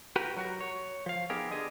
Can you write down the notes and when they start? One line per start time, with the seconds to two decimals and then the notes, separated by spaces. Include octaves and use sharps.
0.16 F#4 G4 A#4 B4
0.37 F#3 F#4 A#4
0.61 C#5
1.06 F3 F5
1.30 B3 D#4 G4 G#4 A#4
1.51 D3 G#4 D#5